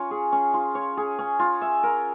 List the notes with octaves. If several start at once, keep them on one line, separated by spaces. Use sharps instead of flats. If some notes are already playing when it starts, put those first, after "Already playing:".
Already playing: C#4 F4 C#5
G#4
C#4
F4
C#5
G#4
C#4
F4
E5
A#4